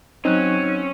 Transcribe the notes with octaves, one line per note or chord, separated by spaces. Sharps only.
F#3 C4 C#4 D#4 F#6